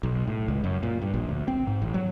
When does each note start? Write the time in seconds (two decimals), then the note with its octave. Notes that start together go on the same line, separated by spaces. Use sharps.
0.03 B1
0.28 A2
0.48 C#2
0.64 F#2
0.83 A#2
1.02 G2
1.14 A#1
1.29 D2
1.48 C4
1.67 G#2
1.82 A1
1.94 F#3